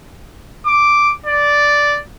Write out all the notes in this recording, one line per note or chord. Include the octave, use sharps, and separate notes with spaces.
D6
D5